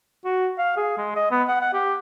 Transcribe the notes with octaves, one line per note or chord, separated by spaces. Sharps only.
F#4
F5
G#4
G#3
D#5
B3
F#5
F#5
G4